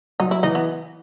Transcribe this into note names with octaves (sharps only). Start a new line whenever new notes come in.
F#3 D#4
E4
E3 D#4
B3